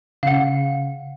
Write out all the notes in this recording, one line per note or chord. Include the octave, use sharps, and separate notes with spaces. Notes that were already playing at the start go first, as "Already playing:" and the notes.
C#3 F5 F#5